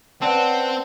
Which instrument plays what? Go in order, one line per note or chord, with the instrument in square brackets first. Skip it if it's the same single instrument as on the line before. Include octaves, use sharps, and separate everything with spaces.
[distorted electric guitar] C4 [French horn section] C#4 B4 [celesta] D5 A5 [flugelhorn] F#5